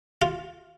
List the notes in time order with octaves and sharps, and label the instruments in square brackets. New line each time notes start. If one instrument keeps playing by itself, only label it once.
[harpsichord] F4